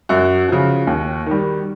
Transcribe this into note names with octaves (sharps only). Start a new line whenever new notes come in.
F#2 F#4
C#3 F3
D#2
D#3 G3